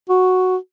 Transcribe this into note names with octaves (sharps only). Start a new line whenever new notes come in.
F#4